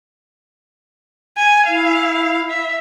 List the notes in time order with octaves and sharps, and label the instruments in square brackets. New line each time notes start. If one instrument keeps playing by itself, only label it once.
[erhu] G#5
[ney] E4 [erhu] F5
[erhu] E5